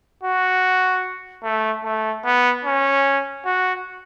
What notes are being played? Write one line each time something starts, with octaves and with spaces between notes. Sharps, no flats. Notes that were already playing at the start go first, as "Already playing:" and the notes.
F#4
A3
A3
B3
C#4
F#4